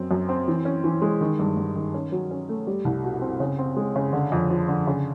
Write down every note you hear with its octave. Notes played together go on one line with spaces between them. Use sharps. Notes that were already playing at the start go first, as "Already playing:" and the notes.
Already playing: F#2 C4
F#2
C4
E3
C#4
E3
G#3
D#3
G2
G2
D#3
C#4
F#3
C#4
A3
G3
C2
B2
C4
C#3
C4
G#3
C#3
D3
F2
F3
D3
C#3